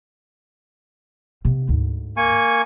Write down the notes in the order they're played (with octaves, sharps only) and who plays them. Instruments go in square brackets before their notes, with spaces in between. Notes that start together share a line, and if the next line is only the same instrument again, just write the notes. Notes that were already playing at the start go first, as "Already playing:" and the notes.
[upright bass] C3 B3
D2 G#2
[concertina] A#3 G#5 C#6